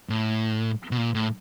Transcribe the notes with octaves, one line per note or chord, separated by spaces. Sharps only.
A2
B2
A#2
A2